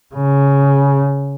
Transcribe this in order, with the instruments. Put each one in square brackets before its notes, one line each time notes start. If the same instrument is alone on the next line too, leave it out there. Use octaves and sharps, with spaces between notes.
[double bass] C#3